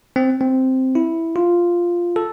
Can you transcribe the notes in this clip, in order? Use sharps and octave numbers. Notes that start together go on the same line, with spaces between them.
C4
C4
E4
F4
A4